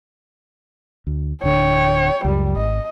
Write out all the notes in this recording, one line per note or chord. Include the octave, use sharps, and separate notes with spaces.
D2
D1 D3 C#5 G5
C#2 F#2 G3
G#1 D#5